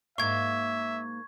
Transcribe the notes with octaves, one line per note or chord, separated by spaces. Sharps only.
G#2 A#3 E5 F5 C#6 G#6